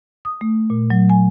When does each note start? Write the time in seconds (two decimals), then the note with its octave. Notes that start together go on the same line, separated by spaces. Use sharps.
0.25 D#6
0.41 A3
0.70 A#2
0.90 F#3
1.10 G#5